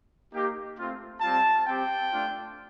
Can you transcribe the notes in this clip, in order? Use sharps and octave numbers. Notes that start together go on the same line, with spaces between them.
A#3 D#4 G4
A3 C4 F4
G3 C4 F4 A5
C4 G4 G5
A3 D4 F4